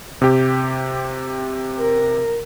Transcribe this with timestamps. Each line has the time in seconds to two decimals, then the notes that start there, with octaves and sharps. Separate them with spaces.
0.22 C3 G4
1.79 A#4